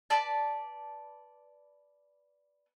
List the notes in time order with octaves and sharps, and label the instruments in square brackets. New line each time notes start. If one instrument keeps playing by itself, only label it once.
[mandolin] B4 D5 A5